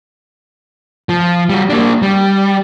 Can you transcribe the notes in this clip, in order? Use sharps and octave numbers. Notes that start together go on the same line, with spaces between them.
F3
G3 F#4
A#3 D4
G3